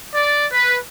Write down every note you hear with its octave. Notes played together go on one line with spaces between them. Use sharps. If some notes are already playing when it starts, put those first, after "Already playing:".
D5
B4